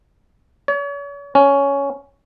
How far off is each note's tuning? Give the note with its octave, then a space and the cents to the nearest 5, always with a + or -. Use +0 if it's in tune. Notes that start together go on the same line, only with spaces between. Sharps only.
C#5 +40
C#4 +10